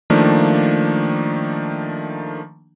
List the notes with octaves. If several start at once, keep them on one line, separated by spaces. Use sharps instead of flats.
D#3 F3 A3 A#3 D4